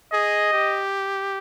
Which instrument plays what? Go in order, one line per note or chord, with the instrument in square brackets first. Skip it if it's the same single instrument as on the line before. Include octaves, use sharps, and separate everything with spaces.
[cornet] G#4 [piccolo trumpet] D#5
[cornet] G4